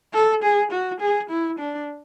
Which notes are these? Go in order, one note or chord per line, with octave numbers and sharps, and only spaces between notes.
A4
G#4
F#4
G#4
E4
D4